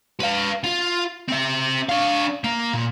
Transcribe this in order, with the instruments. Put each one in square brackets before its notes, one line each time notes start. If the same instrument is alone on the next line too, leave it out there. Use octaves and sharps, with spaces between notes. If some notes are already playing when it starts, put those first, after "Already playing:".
[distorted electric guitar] B4 F5
F4
C4 E5
D4 F5
A#3
A#2